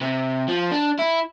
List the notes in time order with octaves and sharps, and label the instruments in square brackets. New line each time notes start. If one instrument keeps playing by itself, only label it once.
[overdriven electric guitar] C3
F3
D4
E4